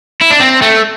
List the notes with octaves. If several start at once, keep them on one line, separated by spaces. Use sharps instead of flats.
E4
D4
C4
A3